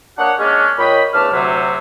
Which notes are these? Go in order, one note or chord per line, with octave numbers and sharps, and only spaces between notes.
A#3 D4 G4 C#5 D#5 F#5
G#3 A#3 C#4 D4
A#2 C#5 D#5 G5 B5
E2 C#3 A3 D4 A5 F6
D2 C3 F#3 E5